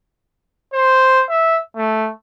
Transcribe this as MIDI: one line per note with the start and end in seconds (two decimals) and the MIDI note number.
0.74 1.23 72
1.30 1.59 76
1.76 2.10 57